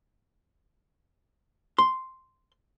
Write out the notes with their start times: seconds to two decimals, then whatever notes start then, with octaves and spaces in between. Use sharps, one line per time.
1.78 C6